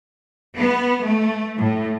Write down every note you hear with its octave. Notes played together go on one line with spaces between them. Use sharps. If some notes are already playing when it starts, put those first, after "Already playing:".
B3
A3
A2